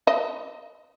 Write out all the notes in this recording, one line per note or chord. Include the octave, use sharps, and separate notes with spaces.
D#5